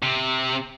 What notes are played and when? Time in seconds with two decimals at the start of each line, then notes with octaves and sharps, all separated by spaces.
0.03 C3